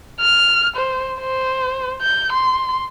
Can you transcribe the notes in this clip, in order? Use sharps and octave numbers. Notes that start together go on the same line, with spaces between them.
F6
C5
C5
G6
C6